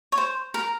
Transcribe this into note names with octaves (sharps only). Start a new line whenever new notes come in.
C#5
C5
A#4